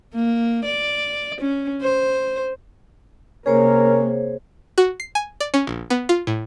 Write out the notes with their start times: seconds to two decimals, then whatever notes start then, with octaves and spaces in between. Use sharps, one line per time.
0.15 A#3
0.65 D5
1.41 C#4
1.82 C5
3.46 C3 A#3 C#4 G#4 A#4 C5 C#5
4.78 F#4
5.00 C7
5.15 G#5
5.40 D5
5.54 C#4
5.67 A#1
5.90 B3
6.09 F4
6.27 A2